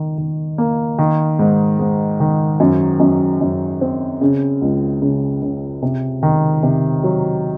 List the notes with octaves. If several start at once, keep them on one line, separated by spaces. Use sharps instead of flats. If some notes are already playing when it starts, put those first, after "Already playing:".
Already playing: D#3
D#3
A#3
D#3
G#2
G#2
D#3
F#2
F#2
F#2
C4
C#3
C#2
C#3
C#3
C3
D#3
C3
F#3